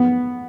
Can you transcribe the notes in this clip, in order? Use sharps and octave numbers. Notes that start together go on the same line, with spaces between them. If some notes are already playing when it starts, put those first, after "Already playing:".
Already playing: B3